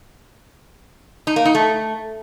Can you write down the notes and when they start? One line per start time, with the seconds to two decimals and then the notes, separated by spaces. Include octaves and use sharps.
1.27 D#4
1.36 A#3
1.45 D#4
1.55 A3